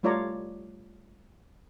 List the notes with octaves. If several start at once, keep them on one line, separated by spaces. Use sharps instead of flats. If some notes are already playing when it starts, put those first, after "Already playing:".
G3 A3 F4 C#5 D5 A#5